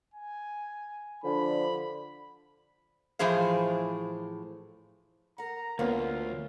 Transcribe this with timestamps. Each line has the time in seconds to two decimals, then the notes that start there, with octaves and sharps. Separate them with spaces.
0.14 G#5
1.24 D3 F3 B5
3.19 A2 E3 F3 G#4 C5 F5
5.38 A#4 F#5 A#5
5.79 D2 A#3 B3 C#4 F4